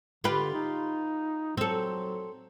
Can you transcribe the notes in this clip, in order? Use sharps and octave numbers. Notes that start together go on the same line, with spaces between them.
D3 F4 G4 B4
D#4
F#3 C4 A4